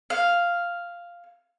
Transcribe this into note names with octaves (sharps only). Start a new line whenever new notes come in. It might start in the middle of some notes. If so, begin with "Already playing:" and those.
F5